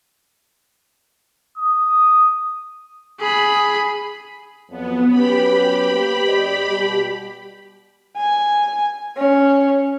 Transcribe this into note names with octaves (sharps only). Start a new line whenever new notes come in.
D#6
G#4 B5
F2 F#3 B3
F#3 C#4 G4 B4 B5
A#3 B4 C5
F#2 D5 D#5
B2 G3
G#5
C#4